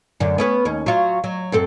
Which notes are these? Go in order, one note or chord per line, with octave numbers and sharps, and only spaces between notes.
F#2 D3
B3 C#4 B4
D#2 C#4
F#3 F4
F#3
F#2 C4 A4